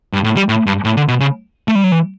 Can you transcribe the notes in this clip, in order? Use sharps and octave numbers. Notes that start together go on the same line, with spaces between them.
G2
A2
G3
A2
G2
A2
D3
B2
C#3
A3
G3
F#3
E3